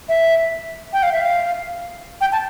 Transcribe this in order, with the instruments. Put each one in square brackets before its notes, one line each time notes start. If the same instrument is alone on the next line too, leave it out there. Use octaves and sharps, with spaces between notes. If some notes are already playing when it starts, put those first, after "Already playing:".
[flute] E5
G5
F5
E5
F5
G5
A5